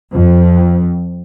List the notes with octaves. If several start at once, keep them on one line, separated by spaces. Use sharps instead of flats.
F2